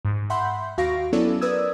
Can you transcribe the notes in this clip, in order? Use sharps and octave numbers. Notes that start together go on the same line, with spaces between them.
G#2
E5 F#5 B5 C6 G6
D#2 F#4 F5 C#6 A#6 D7
F#3 B3 C#4 E4 A4 D5
A#4 B4 D5 D#6 E6 G#6